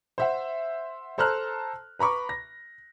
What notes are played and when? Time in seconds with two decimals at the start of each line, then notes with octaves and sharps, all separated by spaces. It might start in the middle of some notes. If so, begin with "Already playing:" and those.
0.18 C5 E5 F#5
1.18 A4 C5 A5 A#5 F6 F#6
1.99 B4 A#5 B5 C#6 D6
2.29 A#6